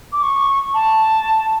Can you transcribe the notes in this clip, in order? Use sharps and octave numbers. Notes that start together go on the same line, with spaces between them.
D6
C#6
A5